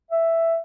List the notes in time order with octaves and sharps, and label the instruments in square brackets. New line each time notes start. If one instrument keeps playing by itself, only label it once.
[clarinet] E5